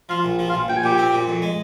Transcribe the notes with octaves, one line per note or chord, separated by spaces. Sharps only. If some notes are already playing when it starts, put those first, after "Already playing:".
F3 F4 F5
A#1
F3
F4 F5
A#1
A#1 G5
G#5
A#2 G4 G5
C4
A#2
F2
G#3